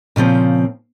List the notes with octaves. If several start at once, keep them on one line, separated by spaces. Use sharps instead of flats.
A#2 C#3 F3 C4